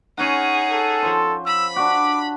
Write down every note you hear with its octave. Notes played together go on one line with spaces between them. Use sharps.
C#4 D#4 G#4 C#5 F#5
A4
F3 C5
B5 E6
D4 F#4 D6